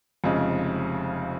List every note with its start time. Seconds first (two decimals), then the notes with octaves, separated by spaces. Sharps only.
0.24 F1 F2 C#3 G#3